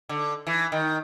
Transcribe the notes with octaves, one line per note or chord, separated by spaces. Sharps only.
D3
E3
D#3